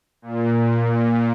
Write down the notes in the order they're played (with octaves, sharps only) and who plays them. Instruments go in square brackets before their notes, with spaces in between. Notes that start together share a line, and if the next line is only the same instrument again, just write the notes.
[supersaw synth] A#2